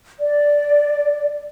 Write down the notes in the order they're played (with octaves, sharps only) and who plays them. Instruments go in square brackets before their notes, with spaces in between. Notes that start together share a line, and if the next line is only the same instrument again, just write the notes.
[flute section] D5